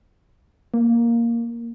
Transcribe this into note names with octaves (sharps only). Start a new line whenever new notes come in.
A#3